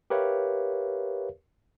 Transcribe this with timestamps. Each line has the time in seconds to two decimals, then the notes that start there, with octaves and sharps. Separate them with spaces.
0.10 G4 A#4 B4 C#5 E5 F5